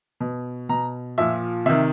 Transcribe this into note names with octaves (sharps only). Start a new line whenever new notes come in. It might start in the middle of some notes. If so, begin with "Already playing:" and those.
B2
B2 A#5
A#2 F3 E5
C3 D#3 E5